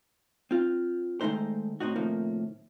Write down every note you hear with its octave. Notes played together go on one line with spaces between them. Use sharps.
C4 F4
D#3 E3 G#3 A3 D#4 C5
A2 C4 D#4 F#4
A2 C3 D#3 F3 A#3